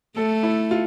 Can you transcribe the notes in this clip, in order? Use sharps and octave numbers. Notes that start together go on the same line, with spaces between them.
A3 A4
E4
F4